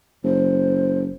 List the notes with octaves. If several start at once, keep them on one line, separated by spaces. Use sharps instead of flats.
F#1 C5